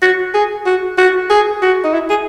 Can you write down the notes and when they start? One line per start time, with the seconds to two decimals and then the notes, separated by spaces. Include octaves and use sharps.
0.02 F#4
0.34 G#4
0.66 F#4
0.98 F#4
1.30 G#4
1.62 F#4
1.84 D#4
1.94 E4
2.10 G#4